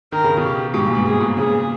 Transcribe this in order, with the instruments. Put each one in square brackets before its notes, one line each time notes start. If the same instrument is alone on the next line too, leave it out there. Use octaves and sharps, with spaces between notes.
[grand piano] D#3 [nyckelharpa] A#4
[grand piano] C#3
B2 D#3
[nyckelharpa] G4
[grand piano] G#2 B2 [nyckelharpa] G4
[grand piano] G2 A#2
G#2
[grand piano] G#2 [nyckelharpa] G#4
[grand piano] G#2 B2
[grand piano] A#2 C#3 [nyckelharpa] G#4